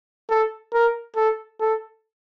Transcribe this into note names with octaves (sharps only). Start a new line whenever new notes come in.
A4
A#4
A4
A4